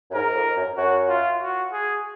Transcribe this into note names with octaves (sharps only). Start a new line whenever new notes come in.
F#2
G#2 A#4
F2
F#2
F#2 F#4
F4
F#4
G#4